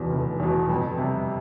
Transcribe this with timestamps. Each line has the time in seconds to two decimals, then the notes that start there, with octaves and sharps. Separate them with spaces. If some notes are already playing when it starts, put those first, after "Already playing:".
Already playing: F1 E2 B2
0.10 F1
0.40 E2 B2
0.69 F2
0.98 C3 G3